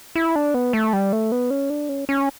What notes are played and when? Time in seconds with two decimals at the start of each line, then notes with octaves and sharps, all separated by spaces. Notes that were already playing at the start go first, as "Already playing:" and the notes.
0.16 E4
0.36 D4
0.54 B3
0.73 A3
0.93 G3
1.12 A3
1.32 B3
1.50 C#4
1.70 D4
1.89 C#4
2.09 C#4